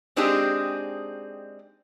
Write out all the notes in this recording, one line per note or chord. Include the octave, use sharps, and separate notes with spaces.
G#3 C4 D4 D#4 G4 G#4